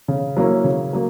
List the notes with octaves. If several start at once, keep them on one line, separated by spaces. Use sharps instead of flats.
C#3
F#3 A#3 C#4 E4
C#3
F#3 A#3